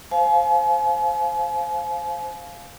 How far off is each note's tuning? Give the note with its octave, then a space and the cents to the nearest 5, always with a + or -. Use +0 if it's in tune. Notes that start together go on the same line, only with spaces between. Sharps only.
C5 +0 F5 +0 G#5 +45